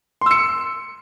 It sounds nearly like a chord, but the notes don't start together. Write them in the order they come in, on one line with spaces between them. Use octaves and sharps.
C6 E6 C#7